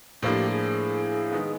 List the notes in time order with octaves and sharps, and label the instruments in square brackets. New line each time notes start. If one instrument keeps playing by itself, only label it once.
[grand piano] A2 F3 A#3 D4 [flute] G4
[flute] G#4
[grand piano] D#3 G#3 B3